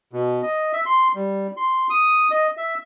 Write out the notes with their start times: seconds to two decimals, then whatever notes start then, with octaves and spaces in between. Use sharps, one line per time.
0.13 B2
0.43 D#5
0.73 E5
0.86 C6
1.15 G3
1.57 C6
1.90 D#6
2.31 D#5
2.57 E5